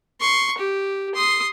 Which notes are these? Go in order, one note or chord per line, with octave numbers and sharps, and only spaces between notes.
C6 C#6
G4
C6 D#6